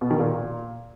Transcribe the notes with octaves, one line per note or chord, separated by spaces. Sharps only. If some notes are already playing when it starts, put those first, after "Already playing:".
B2
D#3
A#2